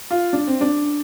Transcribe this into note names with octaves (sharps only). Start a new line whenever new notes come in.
F4
D4
C4
D4